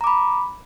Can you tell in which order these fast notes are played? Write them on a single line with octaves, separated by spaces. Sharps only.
A#5 D6 B5